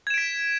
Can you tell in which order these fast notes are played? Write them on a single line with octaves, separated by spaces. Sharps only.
G#6 E7 D7 B6